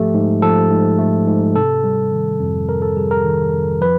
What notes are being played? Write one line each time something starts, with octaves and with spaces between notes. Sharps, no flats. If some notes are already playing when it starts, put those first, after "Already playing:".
Already playing: G#2 F3 A3 G4
G#2
F3 A4
G#2
A3
G#2
C3 A4
G3
D#3
F2
C3 A#4
A4
G3 G#4
A#4
D#3
F2
F3 B4